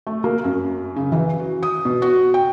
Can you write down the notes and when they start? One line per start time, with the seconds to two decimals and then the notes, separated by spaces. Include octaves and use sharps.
0.07 A3
0.24 A#3
0.44 F#2
0.96 C#3
1.12 E3
1.39 F#4
1.63 D#6
1.85 B2
2.02 F#4
2.34 G5